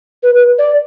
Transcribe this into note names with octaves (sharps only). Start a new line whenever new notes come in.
B4
B4
D5